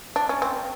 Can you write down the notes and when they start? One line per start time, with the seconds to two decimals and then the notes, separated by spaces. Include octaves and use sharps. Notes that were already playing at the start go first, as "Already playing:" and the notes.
0.16 D4
0.29 C#4
0.42 C4